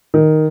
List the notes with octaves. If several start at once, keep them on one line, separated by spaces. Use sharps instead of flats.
D#3